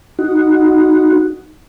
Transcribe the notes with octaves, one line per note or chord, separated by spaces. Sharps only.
D#4 F#4